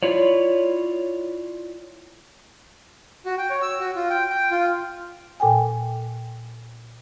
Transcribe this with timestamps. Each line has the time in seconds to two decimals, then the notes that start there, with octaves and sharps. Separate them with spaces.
0.03 E4 F4 C#5 D5
3.25 F#4
3.38 G5
3.50 C#5
3.62 E6
3.80 F#4
3.96 F4
4.10 G5
4.30 G5
4.51 F4
5.40 A#2 A4 G5 G#5